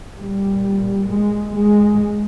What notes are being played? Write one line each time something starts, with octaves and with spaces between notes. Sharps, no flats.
A#2 G3
G#3
G#3